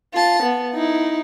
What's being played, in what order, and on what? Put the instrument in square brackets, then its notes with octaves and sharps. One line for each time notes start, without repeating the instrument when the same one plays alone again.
[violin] F4 A5
B3
D#4 E4